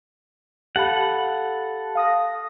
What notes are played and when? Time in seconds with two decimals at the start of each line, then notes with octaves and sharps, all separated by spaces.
0.76 G4 A4 F5 F#5 B5
1.95 F5 D#6 A#6